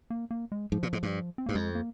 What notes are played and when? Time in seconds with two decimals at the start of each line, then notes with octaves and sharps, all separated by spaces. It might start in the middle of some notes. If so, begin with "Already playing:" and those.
0.10 A#3
0.31 A#3
0.52 G#3
0.72 G#2 F3
0.83 A#2
0.93 G#2
1.03 G2
1.38 C4
1.46 G2 A#3
1.55 F2 G#3
1.75 A#3